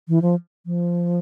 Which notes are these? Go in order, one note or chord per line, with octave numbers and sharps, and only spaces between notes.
E3
F3
F3